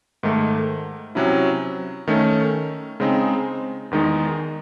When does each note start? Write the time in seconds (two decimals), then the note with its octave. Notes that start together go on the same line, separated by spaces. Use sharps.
0.23 G#2 D#3 A3
1.15 C3 F#3 C#4 E4
2.07 D#3 A3 C#4
3.00 C#3 G#3 C4 D#4
3.91 E2 D#3 G#3 D#4